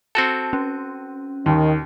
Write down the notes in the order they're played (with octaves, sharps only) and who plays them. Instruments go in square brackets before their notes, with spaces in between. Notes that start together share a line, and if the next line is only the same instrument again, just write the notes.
[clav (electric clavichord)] C4 F#4 A4 [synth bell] A5
[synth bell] C#4
[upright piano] D#2 [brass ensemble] D#3